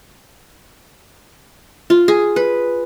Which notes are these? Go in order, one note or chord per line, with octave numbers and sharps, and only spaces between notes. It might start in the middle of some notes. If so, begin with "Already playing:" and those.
F4
G#4
B4